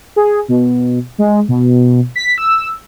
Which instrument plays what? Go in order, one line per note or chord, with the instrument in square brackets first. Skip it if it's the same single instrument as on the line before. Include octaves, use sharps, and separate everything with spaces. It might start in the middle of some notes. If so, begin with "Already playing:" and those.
[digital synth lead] G#4
B2
G#3
B2
B6
E6